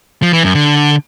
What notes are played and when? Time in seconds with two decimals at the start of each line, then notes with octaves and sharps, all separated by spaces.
0.22 F3
0.33 E3
0.44 F#2
0.55 D3